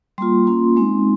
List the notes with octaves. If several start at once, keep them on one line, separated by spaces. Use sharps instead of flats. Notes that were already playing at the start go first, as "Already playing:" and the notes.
G3 A#3 F4 C6
A#3 C#4 F4
G#3 C4 D#4